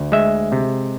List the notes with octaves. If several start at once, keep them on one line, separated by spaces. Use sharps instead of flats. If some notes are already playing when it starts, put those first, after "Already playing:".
Already playing: D2
G#3 E5
C3